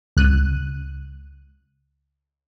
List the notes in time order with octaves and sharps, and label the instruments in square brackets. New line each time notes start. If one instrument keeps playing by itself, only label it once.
[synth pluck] C#2 F#6 D#7